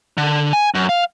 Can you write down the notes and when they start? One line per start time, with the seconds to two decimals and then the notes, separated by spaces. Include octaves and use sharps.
0.17 D3
0.53 G#5
0.74 F#2
0.89 F5